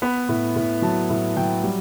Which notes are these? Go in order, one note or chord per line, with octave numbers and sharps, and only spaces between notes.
B3 B5
A2
A2
F#3 A5
A2
F#3 G5
G3